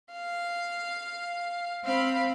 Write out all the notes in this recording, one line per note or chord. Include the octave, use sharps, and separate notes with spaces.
F5
C4 F5 B5